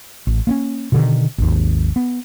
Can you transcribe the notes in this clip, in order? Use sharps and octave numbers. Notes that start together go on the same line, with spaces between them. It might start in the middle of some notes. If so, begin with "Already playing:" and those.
A1
A#3 C4 C#4
B2 D3 D#3
G#1 D#2
B3